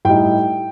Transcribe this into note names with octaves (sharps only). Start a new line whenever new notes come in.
A2 G3 D#4 G5